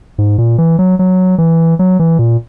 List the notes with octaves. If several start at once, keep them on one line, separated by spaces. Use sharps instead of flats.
G#2
A#2
E3
F#3
F#3
E3
F#3
E3
A#2